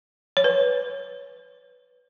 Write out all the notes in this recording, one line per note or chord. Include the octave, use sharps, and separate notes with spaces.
C#5
B4